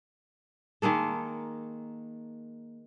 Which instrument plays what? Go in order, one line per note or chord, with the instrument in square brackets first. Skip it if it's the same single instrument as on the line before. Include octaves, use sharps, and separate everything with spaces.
[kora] D#3 G#3 A#3 A4